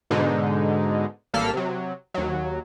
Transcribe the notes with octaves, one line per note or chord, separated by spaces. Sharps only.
G#2 B2 D3 G#3 D#4
A1 G3 A#3 A4 F6 B6
C3 F#3
D#2 F#3